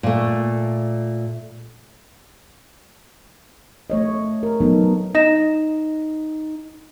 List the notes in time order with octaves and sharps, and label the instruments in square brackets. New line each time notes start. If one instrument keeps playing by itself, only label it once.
[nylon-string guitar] A#2 A3
[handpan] A3 C#5 D#5
A#4
F#3 B3 D#4 A4
[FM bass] D#4 [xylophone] D#5 A#6 E7